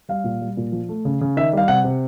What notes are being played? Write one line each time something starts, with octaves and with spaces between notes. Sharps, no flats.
G3 F5
A#2
G3
A#2
F3
A3
C#3
C#3
D#3 E5
G3 F5
C3 F#5
C3